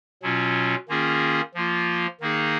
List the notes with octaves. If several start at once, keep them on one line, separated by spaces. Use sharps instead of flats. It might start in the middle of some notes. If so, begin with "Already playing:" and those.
B2 F#3 C#4 F4
D#3 A#3 C#4 F4 G#4
F3 A#3 F4
D#3 A#3 D#4 G#4